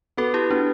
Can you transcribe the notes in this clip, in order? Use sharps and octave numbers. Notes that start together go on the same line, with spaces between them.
B3 F#4 A4
E4 G4
B3 D4 F#4